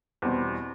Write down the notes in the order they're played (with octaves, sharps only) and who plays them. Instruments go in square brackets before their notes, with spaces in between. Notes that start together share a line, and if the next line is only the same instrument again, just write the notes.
[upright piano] E2 B2 G3 C4